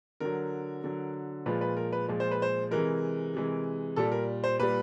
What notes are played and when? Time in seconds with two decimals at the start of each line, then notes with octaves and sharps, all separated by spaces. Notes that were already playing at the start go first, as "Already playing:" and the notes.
0.20 D3 F#3 A#4
0.84 D3 F#3
1.46 A#2 F3 G#3 B4
1.61 B4
1.77 A#4
1.93 B4
2.09 A#2 F3 G#3
2.20 C5
2.31 B4
2.42 C5
2.71 C3 E3 G#3 A#4
3.34 C3 E3 G#3
3.96 A#2 G3 A4
4.12 A#4
4.44 C5
4.60 A#2 G3 B4